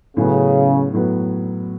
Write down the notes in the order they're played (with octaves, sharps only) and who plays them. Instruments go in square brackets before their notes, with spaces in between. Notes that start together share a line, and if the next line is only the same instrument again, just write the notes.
[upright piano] A2 F#3 B3 [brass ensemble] C#3
[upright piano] A2 F#3 B3